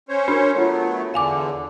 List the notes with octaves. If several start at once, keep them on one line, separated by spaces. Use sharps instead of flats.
C#4 C5 C#5
D4 F#4 A#4
F#3 A3 B3 F4 C#5
E2 D3 F5 G#5 D6